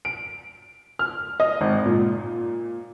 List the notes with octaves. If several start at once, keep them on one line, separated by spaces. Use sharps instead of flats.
D7
F6
D#5
G#1
A#2